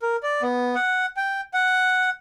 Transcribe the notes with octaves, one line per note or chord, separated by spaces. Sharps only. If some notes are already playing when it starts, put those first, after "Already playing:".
A#4
D5
B3
F#5
G5
F#5